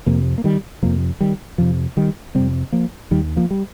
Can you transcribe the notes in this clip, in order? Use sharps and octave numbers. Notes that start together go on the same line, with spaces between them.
F2 C3 F3 A#3
A#3
D#3 G3
F2 C3 F3 A#3
D#3 G3
F2 C3 F3
D#3 G3
F2 C3 G3 C4
F3 A#3
D#2 D#3 G3
F3 A#3
G3